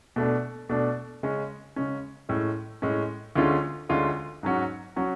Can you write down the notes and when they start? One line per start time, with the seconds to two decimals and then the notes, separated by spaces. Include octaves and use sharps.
0.16 B2 A3 D4
0.69 B2 A3 D4
1.23 C#3 G#3 C#4
1.76 C#3 G#3 C#4
2.29 A2 G#3 C#4
2.82 A2 G#3 C#4
3.36 D2 D3 G#3 C#4 F4
3.89 D2 D3 G#3 C#4 F4
4.43 G#2 F#3 C#4 F#4
4.96 F#3 C#4 F#4